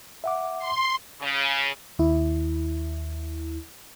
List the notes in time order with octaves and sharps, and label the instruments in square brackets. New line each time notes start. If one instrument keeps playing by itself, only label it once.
[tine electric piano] E5 F#5 D6
[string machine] C6
[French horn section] C#3
[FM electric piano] D#2 E4